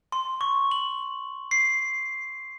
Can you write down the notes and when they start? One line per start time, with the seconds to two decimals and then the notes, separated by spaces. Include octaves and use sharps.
0.12 C6
0.41 C#6
0.71 F#7
1.51 C7